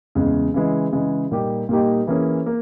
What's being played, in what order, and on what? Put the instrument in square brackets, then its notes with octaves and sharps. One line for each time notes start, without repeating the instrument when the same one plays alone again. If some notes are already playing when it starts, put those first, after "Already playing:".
[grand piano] E2 C#3 G#3
C#3 E3 G#3
C#3 E3 G#3
A#2 G3 A#3 D#4 G4
A#2 G3 A#3 D#4 G4
E3 A#3 C#4 G#4
A#3